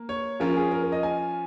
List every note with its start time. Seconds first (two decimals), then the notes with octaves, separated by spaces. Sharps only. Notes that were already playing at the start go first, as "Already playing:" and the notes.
Already playing: A#3
0.09 C#5
0.40 F3 C#4 F4 A#4
0.57 G#4
0.71 A#4
0.82 A#4
0.92 D#5
1.03 G#5